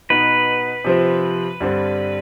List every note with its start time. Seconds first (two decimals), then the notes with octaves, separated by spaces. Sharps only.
0.10 B2 B3 D#4 B4
0.84 C3 F3 C4
1.60 G2 D3 G3 C4